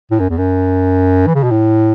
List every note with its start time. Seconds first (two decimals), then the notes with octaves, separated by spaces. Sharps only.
0.11 A2
0.20 F#2
0.29 E2
0.38 F#2
1.27 E3
1.35 C#3
1.43 B2
1.51 A2